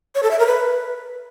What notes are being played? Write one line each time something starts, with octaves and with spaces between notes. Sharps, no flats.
C#5
A4
E5
A#4
B4